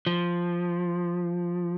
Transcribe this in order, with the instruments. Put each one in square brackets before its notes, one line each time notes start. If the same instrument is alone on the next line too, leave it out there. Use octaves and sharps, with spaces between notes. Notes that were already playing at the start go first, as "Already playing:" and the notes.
[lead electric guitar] F3